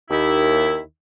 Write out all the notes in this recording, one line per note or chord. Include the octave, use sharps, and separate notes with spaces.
D#2 D#3 E4